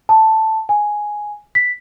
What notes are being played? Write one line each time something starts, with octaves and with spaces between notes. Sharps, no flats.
A5
G#5
B6